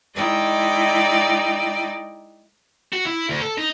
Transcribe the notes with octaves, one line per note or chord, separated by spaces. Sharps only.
G#3 D#4 E4 D5 G5
F#4
E4
D2
A4
D#4